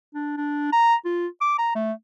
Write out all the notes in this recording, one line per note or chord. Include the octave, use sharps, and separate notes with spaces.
D4
D4
A#5
F4
D6
A#5
A3